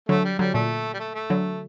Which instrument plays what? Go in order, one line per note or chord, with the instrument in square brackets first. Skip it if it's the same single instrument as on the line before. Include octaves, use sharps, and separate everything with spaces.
[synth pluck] D3 F#3 [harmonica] A3
[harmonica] G3
[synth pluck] D3 F#3 [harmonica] G3
[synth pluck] A#2 [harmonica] A3
[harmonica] G3
A3
A3
[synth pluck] D3 F#3